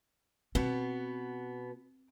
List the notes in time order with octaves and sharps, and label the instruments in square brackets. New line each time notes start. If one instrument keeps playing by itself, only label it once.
[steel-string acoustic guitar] B2 B3 [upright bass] C4